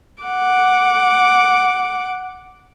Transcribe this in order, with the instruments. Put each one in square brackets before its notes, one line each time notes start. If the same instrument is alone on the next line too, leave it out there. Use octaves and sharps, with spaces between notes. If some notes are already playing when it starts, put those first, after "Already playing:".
[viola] F#5 D6